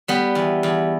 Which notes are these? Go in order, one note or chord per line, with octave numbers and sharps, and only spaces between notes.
G3 B3
E2
E2